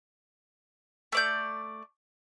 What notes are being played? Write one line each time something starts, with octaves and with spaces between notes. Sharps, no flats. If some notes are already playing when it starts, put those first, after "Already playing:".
A3 D5 G6